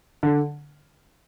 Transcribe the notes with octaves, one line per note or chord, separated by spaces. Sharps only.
D3